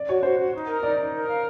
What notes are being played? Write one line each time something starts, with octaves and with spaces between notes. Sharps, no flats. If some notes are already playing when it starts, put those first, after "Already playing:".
Already playing: D5
F#4 C#5
F#4 C5
F#4
D#4
A#4
D#4 D5
D#4
A#4
F5